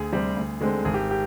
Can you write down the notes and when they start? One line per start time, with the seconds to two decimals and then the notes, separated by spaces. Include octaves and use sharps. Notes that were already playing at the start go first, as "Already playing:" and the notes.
Already playing: D2 G#4
0.12 C3 G3 C4
0.37 D2
0.61 D3 G#3 C4
0.85 G#1 G#4
0.94 G4
1.11 G4